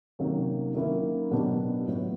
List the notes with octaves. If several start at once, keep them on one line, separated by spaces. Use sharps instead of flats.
C3 D#3 F#3 A#3 C#4
D#3 F#3 A#3 C#4 E4
B2 F#3 B3 D4 G4
A2 F#3 B3